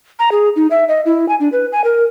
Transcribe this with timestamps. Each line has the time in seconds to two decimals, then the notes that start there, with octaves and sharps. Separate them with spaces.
0.19 A#5
0.32 G#4
0.56 D#4
0.71 E5
0.89 D#5
1.06 E4
1.29 G#5
1.40 D4
1.52 B4
1.73 G#5
1.84 A#4